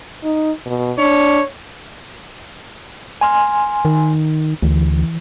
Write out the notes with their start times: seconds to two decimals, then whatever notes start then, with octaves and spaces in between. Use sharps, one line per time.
0.24 D#4
0.66 B2
0.98 D4 C#5
3.21 G#5 C6 F6
3.85 D#3
4.63 D2 E3